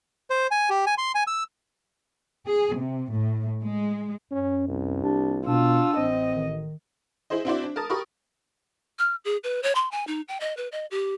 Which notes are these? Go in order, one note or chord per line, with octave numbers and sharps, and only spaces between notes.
C5
G#5
G4
G#5
C6
G#5
E6
G#4
C3
A2
G#3
F#2 C#4
C2
A#3 D4 F4 G4
B2 D4 F4 E6
A1 C4 D#5
D#3
E4 G#4 C5 D#5
C4 D4 E4 F#4 C5 D5
D4
A#4 A5 D#6 A6
G4 A#4 B5 C#6 D#6
F6
G#4
B4
C#5
C6
G#5
D#4
G5
D#5
B4
D#5
G4